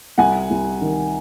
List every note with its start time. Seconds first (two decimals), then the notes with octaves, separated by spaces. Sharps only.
0.18 C2 F#5 G#5
0.50 C2
0.81 D#3